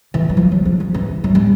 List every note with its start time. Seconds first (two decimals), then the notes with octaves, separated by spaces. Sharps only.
0.14 E3
0.29 F#3
0.37 F3
0.52 F#3
0.65 F3
0.80 F3
0.94 E3
1.24 F#3
1.35 G3